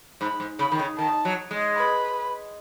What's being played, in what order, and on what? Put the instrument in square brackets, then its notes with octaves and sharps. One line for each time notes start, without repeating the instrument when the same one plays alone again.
[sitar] G#2 [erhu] B5
[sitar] G#2
[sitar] C#3 [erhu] B5
[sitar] D#3
C#3
[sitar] D#3 [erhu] A5
[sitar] F#3
G#3
[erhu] B4